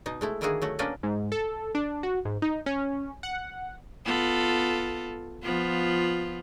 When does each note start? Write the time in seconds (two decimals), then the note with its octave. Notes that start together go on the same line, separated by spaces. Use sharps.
0.06 B2 D#4
0.21 G#3 A3 E4
0.41 D3 D#3 A#3 E4 F#4 G#4
0.62 F#3 A3 F#4
0.79 A#3 C#4 D4 B4 D5 D#5
1.03 G#2
1.32 A4
1.75 D4
2.03 F#4
2.25 G#2
2.42 D#4
2.66 C#4
3.23 F#5
4.06 B3 F4 A4
5.43 F3 B3 F4